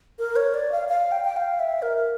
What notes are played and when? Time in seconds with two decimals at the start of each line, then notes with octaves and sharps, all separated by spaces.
0.19 A#4
0.36 C#5
0.54 D5
0.72 F5
0.89 F5
1.12 G5
1.24 G5
1.36 F5
1.59 E5
1.82 A#4